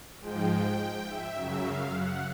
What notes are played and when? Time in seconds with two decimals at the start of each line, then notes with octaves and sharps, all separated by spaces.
0.20 G#2 F3 G#3 G5
0.49 G5
1.06 E5
1.33 F#2 C#3 F#3
1.61 F5
1.90 F#5